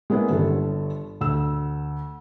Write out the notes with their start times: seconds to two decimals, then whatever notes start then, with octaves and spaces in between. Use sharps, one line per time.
0.10 G#3 A#3 B3 C#4 E4 G#4
0.30 G1 G2 A4
1.21 D2 E6